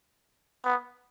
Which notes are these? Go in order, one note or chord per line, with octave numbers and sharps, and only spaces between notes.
B3